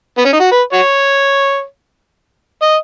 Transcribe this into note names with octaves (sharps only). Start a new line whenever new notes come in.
B3
C#4
D#4
F#4
B4
F#4 C#5
D#5